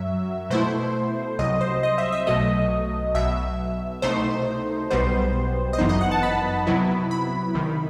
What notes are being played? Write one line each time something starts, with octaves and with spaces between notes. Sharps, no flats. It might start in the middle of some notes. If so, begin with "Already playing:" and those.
Already playing: F#2 F#3 E5
B2 A3 E4 C5
C2 C3 F#3 D#5
C5
D#5
E5
E5
B1 B2 F#3 A3 D#5
B1 B2 F#3 E5
C2 B2 A3 D#4 C5
B1 B2 G3 B3 C5
D#5
G1 F#2 E3 B3 D#4 C5
D#5
F#5
A5
B5
C2 C3 F#3 B3 E4
B5
C2 C3 D#3